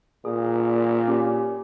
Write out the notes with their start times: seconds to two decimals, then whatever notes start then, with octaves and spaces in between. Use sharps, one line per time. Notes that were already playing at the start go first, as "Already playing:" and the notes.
0.25 A#2 G#4
1.08 C#4 G4